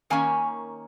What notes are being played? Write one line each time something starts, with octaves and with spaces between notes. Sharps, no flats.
D#3 A#3 C#4 G#5